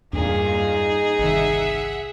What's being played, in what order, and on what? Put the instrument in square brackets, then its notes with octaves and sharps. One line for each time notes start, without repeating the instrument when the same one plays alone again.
[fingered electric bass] E2 D4 [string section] G2 A#2 F5 [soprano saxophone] D#4 [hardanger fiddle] G#4
[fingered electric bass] G1 C2 D#3 [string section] E5 F#5